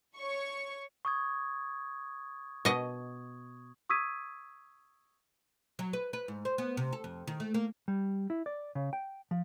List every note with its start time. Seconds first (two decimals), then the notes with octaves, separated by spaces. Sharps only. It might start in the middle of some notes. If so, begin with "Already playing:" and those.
0.17 C#5 C#6
1.05 C#6 D#6 G#6
2.65 B2 D#5
3.89 C#6 D#6 E6 G#6 B6 D#7
5.79 F#3
5.93 B4
6.13 B4
6.28 G#2
6.45 C5
6.58 B3
6.77 C3
6.93 A4
7.04 F2
7.27 D#3
7.40 A3
7.54 A#3
7.88 G3
8.30 E4
8.46 D5
8.75 C#3
8.93 G5
9.31 F3